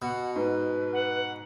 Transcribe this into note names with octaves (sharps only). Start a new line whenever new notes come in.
B2 F#5
G#2 B4
F#5